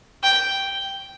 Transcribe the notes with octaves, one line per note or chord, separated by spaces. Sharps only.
G5